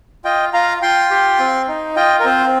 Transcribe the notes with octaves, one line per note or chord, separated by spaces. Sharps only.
F4 D#5 G5
F4 F5 A#5
F4 G5 C6
G4
C4
D#4
F4 D#5 G5
A#4
C4 C5